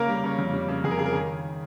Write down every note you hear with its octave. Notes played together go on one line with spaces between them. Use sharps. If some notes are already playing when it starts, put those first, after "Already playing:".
Already playing: C#3 A#3 A#4
G3
C#3
F2
G3
C#3
F2 G#4
A#4
C#3 G#4
A#4
D#3 G#4